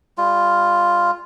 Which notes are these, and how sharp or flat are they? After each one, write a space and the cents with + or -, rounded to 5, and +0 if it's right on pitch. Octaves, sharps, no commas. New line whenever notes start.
G3 +30 F4 +0